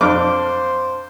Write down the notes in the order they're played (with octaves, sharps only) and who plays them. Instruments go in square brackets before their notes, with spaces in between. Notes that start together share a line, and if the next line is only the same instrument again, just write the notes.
[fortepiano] F2 D4 F6 [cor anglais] C5 [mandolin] D6